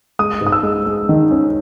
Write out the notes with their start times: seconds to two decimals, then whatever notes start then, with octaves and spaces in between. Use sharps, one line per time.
0.19 G#3 D#6
0.41 G#2
0.47 D#6
0.52 E6
0.63 G#3
0.86 G#3
1.09 D#3
1.31 C#4